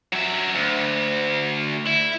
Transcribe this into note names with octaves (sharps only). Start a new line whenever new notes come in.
F#3 E5
D2
E4